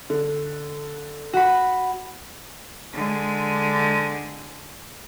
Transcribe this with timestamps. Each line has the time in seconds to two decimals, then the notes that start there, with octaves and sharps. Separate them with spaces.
0.10 D3
1.33 F#4 B5
2.93 D3 G#3